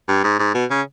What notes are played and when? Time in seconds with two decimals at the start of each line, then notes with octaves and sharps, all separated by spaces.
0.09 G2
0.24 G#2
0.39 G#2
0.55 B2
0.71 C#3